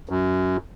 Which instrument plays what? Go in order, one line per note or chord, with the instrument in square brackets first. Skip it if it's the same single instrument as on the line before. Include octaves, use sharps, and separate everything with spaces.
[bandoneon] F#2